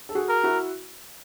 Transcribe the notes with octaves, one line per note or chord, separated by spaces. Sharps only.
A4
F#4 G#4
A#4
E4 F#4